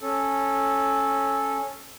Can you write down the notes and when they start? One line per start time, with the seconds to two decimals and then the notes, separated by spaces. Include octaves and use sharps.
0.01 C#4 A4